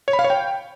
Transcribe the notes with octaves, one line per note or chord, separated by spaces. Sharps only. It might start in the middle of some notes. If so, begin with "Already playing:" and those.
C#5
B5
F5
C#5
G5